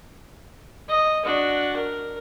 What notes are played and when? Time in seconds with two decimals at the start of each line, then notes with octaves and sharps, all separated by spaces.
0.89 D#5
1.25 D4 F#4
1.76 A#4